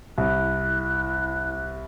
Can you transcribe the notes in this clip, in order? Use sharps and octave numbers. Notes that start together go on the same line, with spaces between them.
C2 E4 F#6